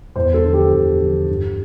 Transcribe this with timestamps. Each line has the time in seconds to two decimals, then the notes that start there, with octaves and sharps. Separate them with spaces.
0.16 E2 C5
0.34 A4
0.44 D3 F3
0.53 G4
0.72 E2 G4
1.00 D3 F3
1.29 G2